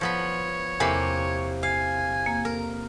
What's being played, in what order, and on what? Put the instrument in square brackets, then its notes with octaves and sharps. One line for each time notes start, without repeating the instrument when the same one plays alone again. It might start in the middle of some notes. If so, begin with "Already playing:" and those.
[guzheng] F3 B3 B5 [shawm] C#5
[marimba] E2 [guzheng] C3 A#3 B5
[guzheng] F5 [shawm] G#5
[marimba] A#3
[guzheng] A#4